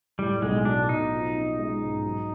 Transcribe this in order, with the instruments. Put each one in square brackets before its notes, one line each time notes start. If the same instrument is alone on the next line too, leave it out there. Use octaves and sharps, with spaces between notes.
[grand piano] A2 [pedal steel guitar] G3
[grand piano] B1 [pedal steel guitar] G#3
[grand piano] F#3 [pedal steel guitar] D4
[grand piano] B1 [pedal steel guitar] D#4
[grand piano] F3
C#4
G#3
G#2
F#3